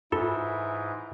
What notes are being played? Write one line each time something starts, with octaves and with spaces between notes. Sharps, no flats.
G#2 E3 F4 A4